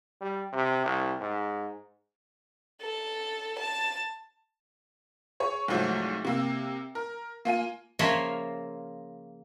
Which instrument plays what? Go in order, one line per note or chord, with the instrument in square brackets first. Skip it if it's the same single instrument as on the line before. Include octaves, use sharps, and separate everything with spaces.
[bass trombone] G3
C3
C2
G#2
[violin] A4
A5
[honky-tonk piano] G#4 C#5
C2 G#2 F3 F#3 A3
C3 A#3 E6
A#4
A#3 F4 G#5 D#7
[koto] C#3 F3 A#3 C#5 E5 F5